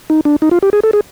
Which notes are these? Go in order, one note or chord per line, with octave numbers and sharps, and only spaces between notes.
D#4
D4
D#4
F4
G4
G#4
A4
G#4